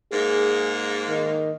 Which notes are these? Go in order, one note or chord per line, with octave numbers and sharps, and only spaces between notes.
G#2 A#3 G#4
D#3